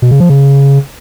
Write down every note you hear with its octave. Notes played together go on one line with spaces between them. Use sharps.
B2
C#3
F3
C#3